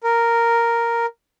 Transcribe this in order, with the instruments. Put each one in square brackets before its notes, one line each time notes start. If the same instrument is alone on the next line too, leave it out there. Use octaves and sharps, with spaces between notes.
[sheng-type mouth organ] A#4